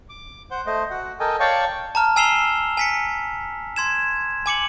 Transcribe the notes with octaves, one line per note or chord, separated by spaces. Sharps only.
D6
C5 F#5 G6
A3 C5 D#5
F#4 F#5
A4 A#4 D#5 G5 G#5
C#5 D5 F5 G5 A5 C#6
A5 A#5 F6
G#5 E6 C7 E7 F7 G7
G#5 B6 C#7
C6 G#6 E7
G#5 D6 C#7 F#7